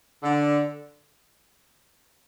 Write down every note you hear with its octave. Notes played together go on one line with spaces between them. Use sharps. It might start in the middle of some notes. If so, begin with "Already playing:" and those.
D3